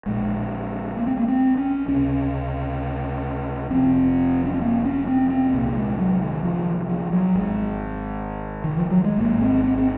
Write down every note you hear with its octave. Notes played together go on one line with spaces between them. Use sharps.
A#1 A#2 G#3
A#3
C4
A#3
C4
C#4
C#2 C3 C#4
F1 F2 C3 C4
C#4
C4
A#3
C#4
C4
C4
C2 A#2 A#3
G#3
F#3
D#3
F3
F3
F#3
G#1 G#2 G#3
D#3
F3
F#3
G#3
G#1 G#2 A#3
C4
C4
C4